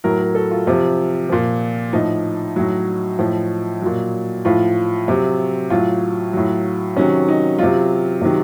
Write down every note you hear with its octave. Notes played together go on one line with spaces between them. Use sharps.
A2 F#3 A#4
A#4
A4
F4
C3 F3 F4
A#2 F3
A2 F3 D#4
A2 F#3
A2 F3
A#2 F#3
A2 F3 F4
C3 F#3
A2 F#3 F4
A2 F#3
C3 D#3 F#3 C#4
D#4
C3 F#3 F4
C3 D#3 F#3